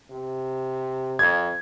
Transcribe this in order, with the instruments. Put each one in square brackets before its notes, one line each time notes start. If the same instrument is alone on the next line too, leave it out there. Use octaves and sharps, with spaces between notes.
[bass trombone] C3
[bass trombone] F2 [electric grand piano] G#6